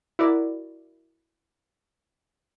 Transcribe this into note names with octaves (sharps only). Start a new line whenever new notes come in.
E4 F#4 A#4 D5